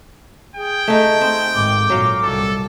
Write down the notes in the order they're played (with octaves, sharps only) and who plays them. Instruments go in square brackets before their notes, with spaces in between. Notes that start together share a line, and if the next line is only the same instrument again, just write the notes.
[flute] G#4 [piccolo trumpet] G5
[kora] A3 D#4
C4
[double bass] G#1 G#2 [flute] D6
[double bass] A#2 [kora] F#3 F5
[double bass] C2 [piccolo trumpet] A4